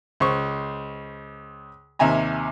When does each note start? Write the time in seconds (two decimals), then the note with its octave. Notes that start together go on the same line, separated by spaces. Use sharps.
0.20 C#2 C5 C#6
1.99 D#2 C3 E5 G#5 A#5